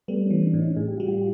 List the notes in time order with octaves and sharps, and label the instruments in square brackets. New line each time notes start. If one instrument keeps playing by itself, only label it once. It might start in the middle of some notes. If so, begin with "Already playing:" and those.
[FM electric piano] G3 [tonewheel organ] A3 B3
[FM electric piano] E3 [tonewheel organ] B3 C#4
[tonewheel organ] C4 D4
[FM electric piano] A2
[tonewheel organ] C#4 D#4
[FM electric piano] A2 [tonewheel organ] G#4
[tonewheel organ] G4
[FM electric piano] G3 [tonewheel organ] F#4
[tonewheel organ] F4 G4